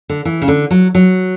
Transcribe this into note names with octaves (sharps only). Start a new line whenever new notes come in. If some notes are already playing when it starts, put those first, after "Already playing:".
D3
E3
C#3
D3
F#3
F#3